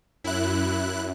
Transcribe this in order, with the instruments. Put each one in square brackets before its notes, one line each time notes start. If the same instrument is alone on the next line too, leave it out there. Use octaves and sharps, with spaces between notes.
[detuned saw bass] F#2 [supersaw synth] E4 F#6